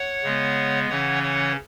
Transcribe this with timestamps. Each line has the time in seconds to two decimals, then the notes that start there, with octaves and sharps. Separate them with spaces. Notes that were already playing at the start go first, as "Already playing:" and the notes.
Already playing: C#5 F#5
0.23 C#3 G#3 B3
0.89 C#3 E3 C#4 C#5 F#5
1.23 C#5 F#5